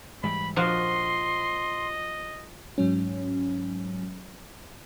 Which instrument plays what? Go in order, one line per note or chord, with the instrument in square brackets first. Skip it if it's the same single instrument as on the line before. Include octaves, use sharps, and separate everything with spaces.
[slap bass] G#2 E3 G3 [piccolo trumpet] B5
[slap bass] A#1 [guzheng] F3 F#4 [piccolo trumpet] D#5 [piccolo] C6
[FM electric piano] G#2 F#3 C#4